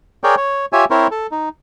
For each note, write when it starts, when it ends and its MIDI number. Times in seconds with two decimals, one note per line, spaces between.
0.24 0.35 68
0.24 0.35 70
0.24 0.35 73
0.24 0.35 74
0.24 0.35 79
0.37 0.66 73
0.73 0.85 65
0.73 0.85 67
0.73 0.85 73
0.73 0.85 76
0.73 0.85 80
0.91 1.07 60
0.91 1.07 64
0.91 1.07 70
0.91 1.07 72
0.91 1.07 73
1.11 1.27 69
1.31 1.49 63